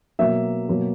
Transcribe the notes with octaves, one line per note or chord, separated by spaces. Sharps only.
B2 F#3 A#3 E5
B2 F#3 A#3